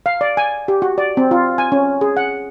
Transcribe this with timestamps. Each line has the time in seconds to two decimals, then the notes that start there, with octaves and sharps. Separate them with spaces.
0.06 F5
0.21 D5
0.37 G#5
0.68 G4
0.82 F#4
0.98 D5
1.17 C4
1.31 F4
1.58 G#5
1.72 C#4
2.01 G#4
2.17 F#5